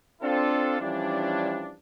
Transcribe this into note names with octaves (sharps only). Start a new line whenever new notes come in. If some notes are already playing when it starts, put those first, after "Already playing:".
C4 D4 F4 A4
E3 F3 G3 C#4 D4